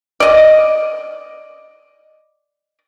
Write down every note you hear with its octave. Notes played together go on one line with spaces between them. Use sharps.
D5 D#5